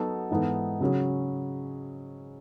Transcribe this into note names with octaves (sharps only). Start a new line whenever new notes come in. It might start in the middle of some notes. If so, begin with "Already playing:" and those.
Already playing: F#3 B3 D#4 F#4 A4
G#2 E3 B3 D#4 A4
C#3 F#3 C#4 G#4